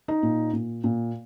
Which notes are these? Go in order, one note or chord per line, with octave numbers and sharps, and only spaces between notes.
D#4
A#2
A#2
A#2